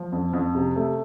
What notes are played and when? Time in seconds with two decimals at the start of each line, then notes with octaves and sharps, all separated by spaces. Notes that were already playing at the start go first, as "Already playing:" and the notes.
Already playing: F3
0.12 F2
0.33 F2
0.55 C3
0.76 A3